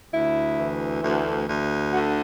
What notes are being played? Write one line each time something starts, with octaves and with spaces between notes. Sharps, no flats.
D2 E4
E3
D2
D2
D3 F#4